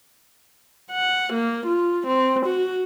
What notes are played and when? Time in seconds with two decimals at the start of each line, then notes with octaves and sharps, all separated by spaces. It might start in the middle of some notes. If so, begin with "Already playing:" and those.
0.91 F#5
1.33 A#3
1.67 F4
2.07 C4
2.47 F#4